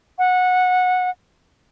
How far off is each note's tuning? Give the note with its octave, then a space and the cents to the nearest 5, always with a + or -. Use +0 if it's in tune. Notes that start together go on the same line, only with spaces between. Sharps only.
F#5 -20